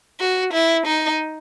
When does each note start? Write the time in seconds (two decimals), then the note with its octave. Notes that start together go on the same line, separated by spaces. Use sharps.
0.20 F#4
0.53 E4
0.87 D#4